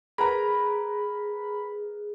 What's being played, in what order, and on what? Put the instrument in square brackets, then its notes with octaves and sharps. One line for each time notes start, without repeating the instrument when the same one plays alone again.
[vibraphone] G#4 [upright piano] A#4 B4 A#5 [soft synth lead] B5